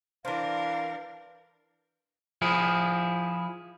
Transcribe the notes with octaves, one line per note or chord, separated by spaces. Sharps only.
E3 D4 A#4 C5 F5
F3 E4 G#4